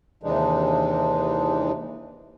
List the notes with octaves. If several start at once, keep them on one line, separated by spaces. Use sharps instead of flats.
D#2 C3 E3 G#3 D4 D#4